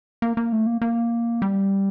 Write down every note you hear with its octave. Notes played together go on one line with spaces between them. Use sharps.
A#3
A#3
A3
A#3
A#3
G3